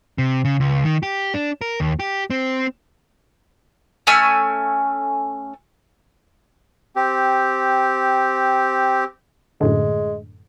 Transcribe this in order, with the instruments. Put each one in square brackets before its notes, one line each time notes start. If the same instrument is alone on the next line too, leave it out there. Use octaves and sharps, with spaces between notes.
[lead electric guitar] C3
C#3
C#2
D#3
G4
D4
A#4
D#2
G4
C4
[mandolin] A3 C#4 G#5 E6
[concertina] C4 G4
[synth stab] F#2 A2 D3 [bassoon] G#3